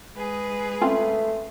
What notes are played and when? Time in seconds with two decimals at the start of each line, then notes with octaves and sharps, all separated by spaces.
0.16 G#3 G#4 B4
0.82 A3 C4 C#4 F4